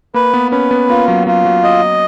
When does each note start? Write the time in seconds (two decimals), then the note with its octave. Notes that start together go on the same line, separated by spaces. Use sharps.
0.14 A#3 B4
0.34 B3
0.51 C#4 B4
0.71 B3
0.89 A#3 F4
1.08 F#3
1.27 F#3 F4
1.45 F#3
1.64 D#5